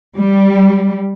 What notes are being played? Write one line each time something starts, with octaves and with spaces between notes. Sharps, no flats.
G3